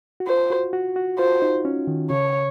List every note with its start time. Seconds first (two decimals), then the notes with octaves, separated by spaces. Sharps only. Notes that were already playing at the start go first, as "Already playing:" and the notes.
0.20 F#4
0.27 F4 C5
0.50 F#4
0.73 F#4
0.96 F#4
1.19 F4 C5
1.42 D#4
1.65 C#4
1.87 D#3
2.10 C#3 C#5